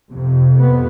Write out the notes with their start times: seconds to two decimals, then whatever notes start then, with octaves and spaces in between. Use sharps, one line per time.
0.12 F2 C3
0.58 B3